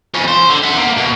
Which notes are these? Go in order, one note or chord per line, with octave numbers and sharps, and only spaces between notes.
F2 C#4
C5
D3
E5 F#5
A#3
B2